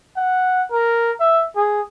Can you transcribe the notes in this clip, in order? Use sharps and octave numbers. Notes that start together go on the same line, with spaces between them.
F#5
A#4
E5
G#4